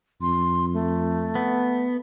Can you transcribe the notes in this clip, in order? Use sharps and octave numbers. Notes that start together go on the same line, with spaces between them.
F2 C6
A3
B3